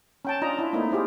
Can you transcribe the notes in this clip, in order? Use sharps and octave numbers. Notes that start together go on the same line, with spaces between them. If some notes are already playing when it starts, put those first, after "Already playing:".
C#4 G5 A5
D4 F4 D#5 A#5
E4
A3 A#3 C4 D#4 E4
C4 E4 F4 G4 G#4